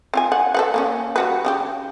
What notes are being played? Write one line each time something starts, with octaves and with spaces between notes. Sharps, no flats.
C4 F4 G#5
F#5
A4 B4 F#5
A#3 B3 C#4
G3 F#4 B4
C#3 F#4 G4